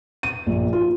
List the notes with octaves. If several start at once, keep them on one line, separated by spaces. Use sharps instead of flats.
D#7
A#1
F4